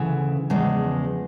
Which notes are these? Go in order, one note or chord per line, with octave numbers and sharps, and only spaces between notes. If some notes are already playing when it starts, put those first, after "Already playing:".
Already playing: D2 C#3 E3
E2 C#3 F3 G#3